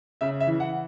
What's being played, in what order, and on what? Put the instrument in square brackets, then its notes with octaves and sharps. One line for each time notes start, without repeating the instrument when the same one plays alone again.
[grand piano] C#3 E5
E5
E3
F#5